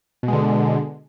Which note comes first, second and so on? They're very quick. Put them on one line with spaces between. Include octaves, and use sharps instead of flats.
B2 G#3 D3